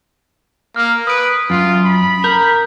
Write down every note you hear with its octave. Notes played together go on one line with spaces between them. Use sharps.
A#3 F6
B4 D#6 D7
F#2 F4
B5
A#4 G6